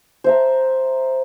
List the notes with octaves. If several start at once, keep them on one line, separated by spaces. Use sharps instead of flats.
C5 E5 A#5